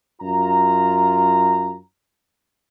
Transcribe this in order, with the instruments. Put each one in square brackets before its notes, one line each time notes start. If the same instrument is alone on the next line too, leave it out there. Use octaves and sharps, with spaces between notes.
[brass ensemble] F#2 F4 A#5